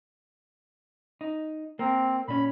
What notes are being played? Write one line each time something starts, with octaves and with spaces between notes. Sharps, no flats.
D#4
A#3 C4
A#2 C#4 B5